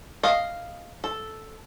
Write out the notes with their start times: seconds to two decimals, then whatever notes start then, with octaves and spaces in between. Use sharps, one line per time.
0.23 D#5 F5
1.04 A4